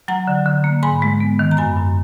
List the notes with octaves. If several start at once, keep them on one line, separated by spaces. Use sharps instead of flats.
F#3 F#5 A#5
D3
D3
A#3
G#2 G#5 B5
G#3
B3
D#3
A#5
F#2 G#5 B5
F#2